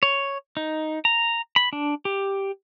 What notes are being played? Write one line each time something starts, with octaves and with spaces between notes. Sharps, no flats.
C#5
D#4
A#5
B5
D4
G4